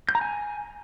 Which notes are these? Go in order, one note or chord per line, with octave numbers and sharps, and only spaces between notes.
G6
A#5
G#5